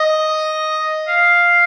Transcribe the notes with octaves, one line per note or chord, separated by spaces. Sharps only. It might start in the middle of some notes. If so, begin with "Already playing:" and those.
Already playing: D#5
F5